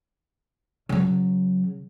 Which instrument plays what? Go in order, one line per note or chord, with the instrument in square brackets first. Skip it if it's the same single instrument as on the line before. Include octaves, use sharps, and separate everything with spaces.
[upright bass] C#3 F#3